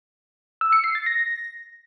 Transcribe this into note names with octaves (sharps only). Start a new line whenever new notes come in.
E6
C#7
C7
A6
A#6